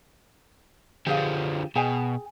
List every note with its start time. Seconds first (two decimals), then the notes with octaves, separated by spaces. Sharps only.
1.07 D3 F3 G4 G#4 F5
1.76 B2 G#4 G5 G#5